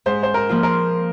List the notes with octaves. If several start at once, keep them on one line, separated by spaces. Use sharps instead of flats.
G#2 C5
C5
A#4
F3 A#3 F4
A#4